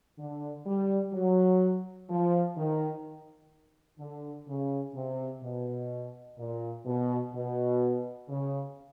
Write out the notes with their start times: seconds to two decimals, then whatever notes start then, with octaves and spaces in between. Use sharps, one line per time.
0.19 D3
0.66 G3
1.13 F#3
2.10 F3
2.57 D#3
3.99 D3
4.48 C#3
4.96 C3
5.42 B2
6.39 A#2
6.86 B2
7.34 B2
8.29 C#3